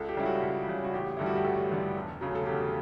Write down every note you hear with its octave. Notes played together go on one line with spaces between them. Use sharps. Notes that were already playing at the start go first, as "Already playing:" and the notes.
Already playing: C#2 A4
G4
C#3 G3 E4
F#4
C#2
C#3 G3
F#4
A1 G4
G2 D3 G3 E4
F#4
G4
A1 A4
G2 D3 G3
E1
D2 C#3 F#3
A4
E1 G4